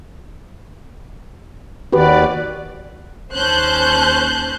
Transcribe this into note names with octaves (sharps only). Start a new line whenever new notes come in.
D#2 F#4 G4 B4 D5
D#2 C#4 C5 A5 F#6 G6